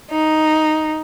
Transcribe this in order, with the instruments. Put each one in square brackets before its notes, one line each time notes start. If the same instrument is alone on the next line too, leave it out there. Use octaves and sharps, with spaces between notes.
[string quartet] D#4